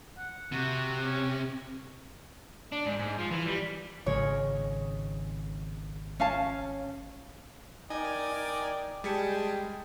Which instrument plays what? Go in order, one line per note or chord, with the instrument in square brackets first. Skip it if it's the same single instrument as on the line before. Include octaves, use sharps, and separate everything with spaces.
[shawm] F#5
[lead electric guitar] C3 [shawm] F#4
[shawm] C#4
[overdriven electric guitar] D4
G#2
G#2
F3
E3
G3
[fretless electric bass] G#1 C#3 G#3 [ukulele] C#5
[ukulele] C#4 F5 A5
[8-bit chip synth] D#4 D#5 G#5 [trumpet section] A#4 D5 G5
[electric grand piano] G3 B6 C#7 [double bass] G#3 [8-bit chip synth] G#4 A5 [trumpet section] G5